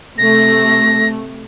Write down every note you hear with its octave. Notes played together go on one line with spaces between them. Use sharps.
C3 A3 A#6